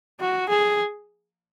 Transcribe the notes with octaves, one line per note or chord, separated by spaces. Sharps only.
F#4
G#4